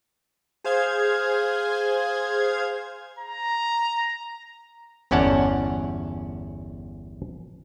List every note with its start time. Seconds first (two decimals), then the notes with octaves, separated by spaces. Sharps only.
0.64 G#4 C5 F5 G#6
3.19 A#5
5.11 G1 E2 C#4 D5 F#5 A5